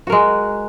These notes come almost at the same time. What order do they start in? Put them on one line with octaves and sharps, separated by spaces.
F#4 A#4 G#3